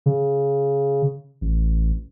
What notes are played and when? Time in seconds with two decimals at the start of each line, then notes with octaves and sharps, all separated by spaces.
0.06 C#3
1.41 A1